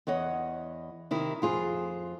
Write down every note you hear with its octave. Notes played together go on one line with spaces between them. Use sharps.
E2 C#5 D#5 F#5
C3 D#3 E4
F2 F4 G#4